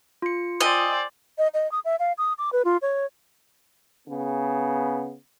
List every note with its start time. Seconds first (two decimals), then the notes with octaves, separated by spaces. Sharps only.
0.22 F4 C#7
0.61 C5 D5 D#5 G5 G#5 E6
1.38 D#5
1.54 D#5
1.72 D#6
1.85 E5
1.99 F5
2.18 D#6
2.38 D6
2.53 B4
2.65 F4
2.82 C#5
4.07 C#3 B3